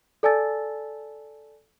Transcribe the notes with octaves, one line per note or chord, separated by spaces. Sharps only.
A4 D5 G#5 A5 E6 A6